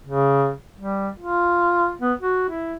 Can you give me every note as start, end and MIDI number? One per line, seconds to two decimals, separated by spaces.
0.06 0.51 49
0.78 1.08 55
1.19 1.91 65
2.02 2.13 59
2.20 2.45 66
2.49 2.76 64